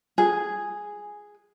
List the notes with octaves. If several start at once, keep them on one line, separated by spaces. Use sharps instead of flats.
G#4